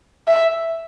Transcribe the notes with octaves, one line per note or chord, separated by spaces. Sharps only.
E5